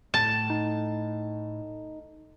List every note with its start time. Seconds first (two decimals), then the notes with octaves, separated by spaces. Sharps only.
0.14 A2 A5
0.50 D#4